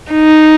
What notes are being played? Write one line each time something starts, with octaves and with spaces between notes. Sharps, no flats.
D#4